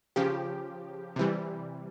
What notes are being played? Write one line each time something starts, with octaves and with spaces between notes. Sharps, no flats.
C#3 F3 G4
C3 E3 G3